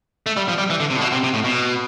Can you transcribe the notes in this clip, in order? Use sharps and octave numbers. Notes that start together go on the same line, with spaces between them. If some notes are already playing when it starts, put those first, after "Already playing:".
A3
G3
F3
G3
E3
D3
C3
A2
B2
C3
C3
A2
B2